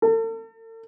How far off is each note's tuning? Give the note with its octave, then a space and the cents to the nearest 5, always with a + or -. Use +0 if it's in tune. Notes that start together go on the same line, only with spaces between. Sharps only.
A4 +45